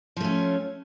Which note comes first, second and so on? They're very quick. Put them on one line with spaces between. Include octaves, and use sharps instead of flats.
F3 A3 C#4